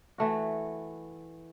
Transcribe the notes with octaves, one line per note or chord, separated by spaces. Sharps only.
E3 A3 F#4